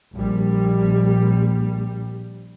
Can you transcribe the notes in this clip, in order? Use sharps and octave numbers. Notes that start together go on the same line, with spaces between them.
A#1 G3